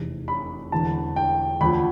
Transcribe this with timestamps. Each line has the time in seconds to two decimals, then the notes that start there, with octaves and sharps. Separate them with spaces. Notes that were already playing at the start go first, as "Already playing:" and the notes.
Already playing: F1 E2 C3
0.28 B5
0.72 E1 E2 D3 A5
1.16 G5
1.61 D2 D3 F3 B5